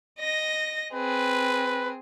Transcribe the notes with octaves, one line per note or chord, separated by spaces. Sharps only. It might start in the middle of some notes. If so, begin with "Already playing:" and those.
D#5 A#6
C4 G#4 B4